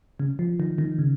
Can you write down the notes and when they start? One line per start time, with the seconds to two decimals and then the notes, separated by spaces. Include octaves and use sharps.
0.20 C#3
0.39 F3
0.60 D#3
0.78 D#3
0.99 C#3